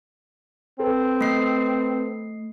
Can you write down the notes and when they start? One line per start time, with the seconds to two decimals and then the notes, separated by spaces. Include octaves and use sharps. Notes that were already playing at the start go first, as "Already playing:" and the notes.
0.80 C4 A4 B4
1.21 A3 C7